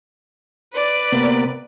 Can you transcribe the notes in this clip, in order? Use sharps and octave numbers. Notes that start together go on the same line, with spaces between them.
B4 D5
C3 A#3 B3